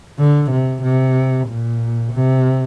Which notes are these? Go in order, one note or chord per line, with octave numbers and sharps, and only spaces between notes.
D3
C3
C3
A#2
C3